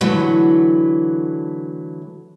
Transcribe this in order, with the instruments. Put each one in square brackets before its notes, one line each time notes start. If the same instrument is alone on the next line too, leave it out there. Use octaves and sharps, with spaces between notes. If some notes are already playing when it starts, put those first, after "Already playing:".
[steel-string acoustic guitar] D3 E3 F#3 A3